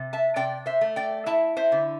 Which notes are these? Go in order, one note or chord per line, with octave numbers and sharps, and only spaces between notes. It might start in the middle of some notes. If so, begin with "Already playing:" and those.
Already playing: C3
E5 A5
C3 D5 G5
C5 E5
A3
D5 G5
E4 E5 A5
C5 E5
D3